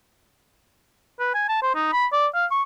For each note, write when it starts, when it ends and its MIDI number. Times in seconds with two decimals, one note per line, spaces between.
1.20 1.31 71
1.34 1.45 80
1.49 1.62 81
1.62 1.74 72
1.75 1.92 63
1.93 2.06 83
2.12 2.27 74
2.34 2.46 77
2.51 2.62 85